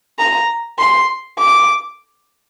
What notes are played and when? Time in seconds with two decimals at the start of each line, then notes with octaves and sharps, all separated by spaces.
0.19 A#5
0.79 C6
1.39 D6